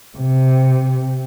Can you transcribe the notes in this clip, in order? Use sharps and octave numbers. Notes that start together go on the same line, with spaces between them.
C3